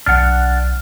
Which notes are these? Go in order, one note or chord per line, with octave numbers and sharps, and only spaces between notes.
B1 D4 F#5 F6